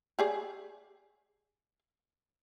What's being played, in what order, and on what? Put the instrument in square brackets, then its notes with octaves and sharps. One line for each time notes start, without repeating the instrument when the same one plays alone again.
[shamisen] G4 G#4 D5